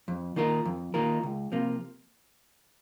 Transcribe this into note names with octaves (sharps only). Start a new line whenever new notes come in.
F2
D#3 A#3 F4 A#4
F2
D#3 A#3 F4 A#4
C#2
C3 F3 A#3 F4